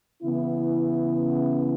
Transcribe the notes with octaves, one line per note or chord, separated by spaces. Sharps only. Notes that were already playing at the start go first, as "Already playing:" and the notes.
C#3 E3 B3 E4